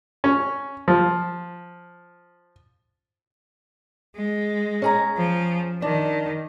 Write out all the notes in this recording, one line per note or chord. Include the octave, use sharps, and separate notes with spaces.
C#4
F3
G#3
C#4 G#4 A#5
F3
D#3 D4